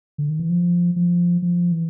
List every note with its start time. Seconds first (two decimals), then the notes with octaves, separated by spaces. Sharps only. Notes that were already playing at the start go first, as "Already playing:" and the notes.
0.18 D3
0.29 D#3
0.39 E3
0.49 F3
0.96 F3
1.42 F3
1.72 E3